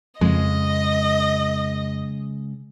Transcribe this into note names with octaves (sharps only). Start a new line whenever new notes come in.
F2 C#3 G#3 D#5